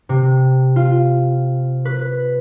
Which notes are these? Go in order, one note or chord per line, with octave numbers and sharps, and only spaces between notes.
C3
F4
B4